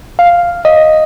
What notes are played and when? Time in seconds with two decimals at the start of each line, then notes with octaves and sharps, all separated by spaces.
0.19 F5
0.65 D#5